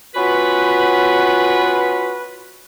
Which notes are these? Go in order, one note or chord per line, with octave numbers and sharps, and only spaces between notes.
B3 C#4 F4 F#4 B4